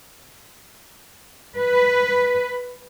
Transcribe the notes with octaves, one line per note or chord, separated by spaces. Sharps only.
B4